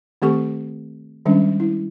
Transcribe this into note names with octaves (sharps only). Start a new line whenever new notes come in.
D#3 A3 C4 G4 A4 C#6
D#3 G3 G#3 C#4 D4
E4